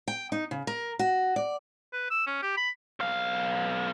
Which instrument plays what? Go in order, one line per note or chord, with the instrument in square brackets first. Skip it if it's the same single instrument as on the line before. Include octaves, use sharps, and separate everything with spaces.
[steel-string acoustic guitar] G5
D#4
C#3
A#4
F#4
D5
[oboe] B4
E6
C#4
G4
B5
[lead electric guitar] B1 F5